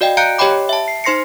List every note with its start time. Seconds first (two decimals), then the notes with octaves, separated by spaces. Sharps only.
0.01 F#4 D5 D#5 F5 G5
0.17 F5 A#5 F#6 G6 C#7 D7
0.38 G4 C#5 D#5 G5 B5 D6
0.69 E5 A5
0.88 C7
1.04 D#4 C5 C6 A#6 C7 C#7